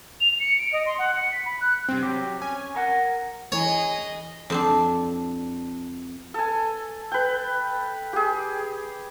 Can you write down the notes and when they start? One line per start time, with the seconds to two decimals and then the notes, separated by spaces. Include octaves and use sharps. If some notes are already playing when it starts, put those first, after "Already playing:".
0.20 F7
0.40 C#7
0.59 D7
0.73 D#5
0.86 C6
0.98 F#5
1.18 C#7
1.32 B6
1.45 B5
1.61 F#6
1.89 G2 C3 C4
2.03 F#3 G4
2.42 C#4 G#5
2.76 A#4 F#5
3.52 E3 E4 G#4 C#5 D#5 B5
4.50 F2 C4 D4
6.34 A4 G#5
7.12 B4 G5
8.13 G4 G#4